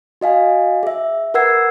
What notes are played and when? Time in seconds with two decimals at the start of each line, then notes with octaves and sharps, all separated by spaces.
0.21 F#4 D#5 F5 G#5
0.83 G#4 E5
1.34 A#4 B4 F#5 E6 G#6 C7